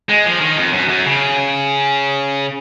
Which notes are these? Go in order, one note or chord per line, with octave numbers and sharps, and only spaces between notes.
G#3
F3
D#3
F2
F#2
F#2
C#3